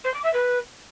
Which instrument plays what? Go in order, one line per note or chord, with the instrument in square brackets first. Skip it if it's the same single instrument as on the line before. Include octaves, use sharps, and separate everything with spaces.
[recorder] C5
D6
E5
B4